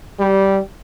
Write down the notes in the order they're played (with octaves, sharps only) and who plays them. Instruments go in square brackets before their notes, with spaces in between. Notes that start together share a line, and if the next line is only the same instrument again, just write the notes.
[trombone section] G3